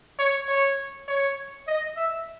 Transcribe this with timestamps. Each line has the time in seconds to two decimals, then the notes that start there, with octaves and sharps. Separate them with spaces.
0.19 C#5
0.48 C#5
1.08 C#5
1.67 D#5
1.96 E5